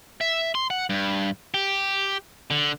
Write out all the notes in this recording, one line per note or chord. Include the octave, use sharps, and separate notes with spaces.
E5
C6
F#5
G2
G4
D3